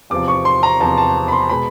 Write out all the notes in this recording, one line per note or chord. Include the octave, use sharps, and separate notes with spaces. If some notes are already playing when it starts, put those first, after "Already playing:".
E2 C3 F3 D6
C#6
C6
A#5
E2 C3 F3 A5
A5
B5
C6
B2 G#3 B5